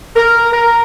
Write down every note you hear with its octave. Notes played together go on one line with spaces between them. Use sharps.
A#4
A#4